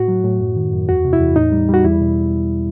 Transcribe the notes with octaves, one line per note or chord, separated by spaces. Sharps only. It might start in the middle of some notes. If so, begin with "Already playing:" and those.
Already playing: A2 F#4
F#3
A2
F#2
D#3
F#2
E2 F#4
C3
E4
E2
A2 D#4
G3
G3 F#4
E2 E4
B2